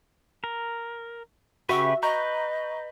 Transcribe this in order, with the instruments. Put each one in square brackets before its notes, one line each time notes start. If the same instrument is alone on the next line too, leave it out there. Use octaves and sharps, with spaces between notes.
[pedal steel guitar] A#4
[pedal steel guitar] C#3 G4 B4 [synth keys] F#4 E5 [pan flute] C#6
[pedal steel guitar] B4 [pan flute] D#5 [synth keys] A#5 C#6 G6